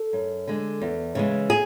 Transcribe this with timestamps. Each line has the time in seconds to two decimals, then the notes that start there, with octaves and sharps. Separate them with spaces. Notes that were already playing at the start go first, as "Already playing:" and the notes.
Already playing: A4
0.13 F#2
0.47 D3 G#3
0.81 E2
1.15 C#3 E3 G#3
1.50 G#4